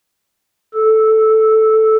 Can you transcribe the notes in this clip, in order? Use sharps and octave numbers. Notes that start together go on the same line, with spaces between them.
A4